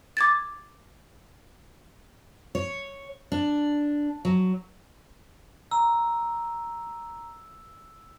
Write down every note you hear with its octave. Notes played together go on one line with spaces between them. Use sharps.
D6 G#6 A6
C#5
D4
F#3
A#5 E6